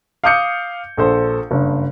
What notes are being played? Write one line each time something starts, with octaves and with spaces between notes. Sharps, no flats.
F5 D6 D#6 G6 C#7
A#1 A4 C5
F#1 G2